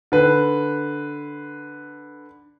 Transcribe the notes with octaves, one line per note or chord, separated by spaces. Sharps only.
D3 B4